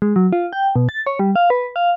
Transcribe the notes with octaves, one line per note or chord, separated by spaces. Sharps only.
G#3
F#3
F4
G5
B2
A6
C#5
G3
F5
B4
F5